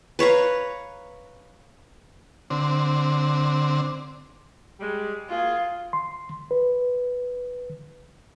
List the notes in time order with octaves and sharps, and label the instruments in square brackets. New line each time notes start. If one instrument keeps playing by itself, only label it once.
[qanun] B4 C#5 F5 A#5
[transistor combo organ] D3 C4
[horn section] G3 G#3
[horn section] A#3 F#4 G#4 [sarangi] F4
[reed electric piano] C6
B4